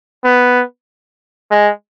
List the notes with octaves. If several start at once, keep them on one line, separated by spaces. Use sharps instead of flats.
B3
G#3